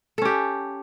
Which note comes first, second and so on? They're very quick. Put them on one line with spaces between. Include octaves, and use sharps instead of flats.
A4 C#4 G4